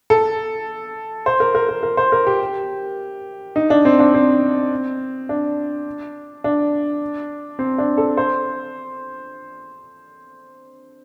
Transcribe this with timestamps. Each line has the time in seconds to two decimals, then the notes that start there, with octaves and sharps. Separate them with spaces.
0.10 A4
1.26 C5
1.40 A#4
1.55 A#4
1.69 A#4
1.83 A#4
1.97 C5
2.12 A#4
2.27 G4
3.56 D#4
3.70 D4
3.85 C4
4.00 D4
4.14 C4
5.29 D4
6.44 D4
7.59 C4
7.78 D4
7.97 A4
8.17 C5